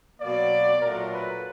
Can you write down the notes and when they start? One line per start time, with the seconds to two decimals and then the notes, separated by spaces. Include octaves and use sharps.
0.21 B2 F#3 A#3 D5
0.82 A#2 F#3 A3 D4 F4 A#4
1.13 B4